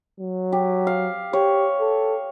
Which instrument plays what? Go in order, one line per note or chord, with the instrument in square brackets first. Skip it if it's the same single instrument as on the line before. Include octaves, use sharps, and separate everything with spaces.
[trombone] F#3
[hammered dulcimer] G4
F5
[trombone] G4 [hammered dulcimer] C#5
[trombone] A4